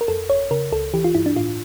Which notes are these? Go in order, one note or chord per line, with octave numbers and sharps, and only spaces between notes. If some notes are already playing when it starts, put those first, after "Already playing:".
A#4
F2 A4
G1 C#5
C#3 A#4
C#2 A4
E3 G4
F4
G2 E4
D4
A2 F4